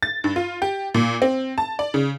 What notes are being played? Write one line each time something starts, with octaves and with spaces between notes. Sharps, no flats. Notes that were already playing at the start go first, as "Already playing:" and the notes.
A6
G2
F4
G4
A#2
C4
A5
D5
C#3